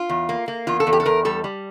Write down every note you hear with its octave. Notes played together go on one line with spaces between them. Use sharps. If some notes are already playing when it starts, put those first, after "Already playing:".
Already playing: F4
E2
A#3
A#3
E2 F4
A4
E2
G4
A4
E2 A#4
G3 A4
G3